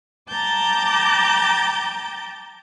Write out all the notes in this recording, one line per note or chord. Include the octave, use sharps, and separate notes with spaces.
G5 A5 A#5 D6 G6 A6